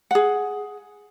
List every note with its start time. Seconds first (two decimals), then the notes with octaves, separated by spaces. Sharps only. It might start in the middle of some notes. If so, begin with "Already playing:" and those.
0.11 G#4 F#5